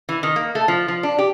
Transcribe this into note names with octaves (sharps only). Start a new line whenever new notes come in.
E3
D#3
A#3
A3
F3
F3
D4
G4